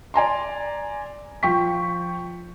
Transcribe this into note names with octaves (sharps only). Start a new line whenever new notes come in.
D5 G#5 A#5 C6
F3 G5 C#6 B6